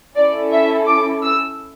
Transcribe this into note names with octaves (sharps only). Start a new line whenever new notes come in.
C#4 E4 A4 D5
E5
D6
E6